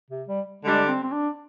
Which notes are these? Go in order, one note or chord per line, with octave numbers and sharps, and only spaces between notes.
C3
G3
D3 G3 G#3 D4
C4
C4
D4